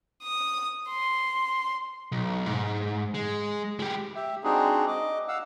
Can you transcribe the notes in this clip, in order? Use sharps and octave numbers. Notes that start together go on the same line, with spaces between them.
D#6
C6
B1
G#2
G#3
G#3 G4
G4 E5
G#3 C4 D4 D#4 F#4 G#4
D#5 D6
F5 F#5 E6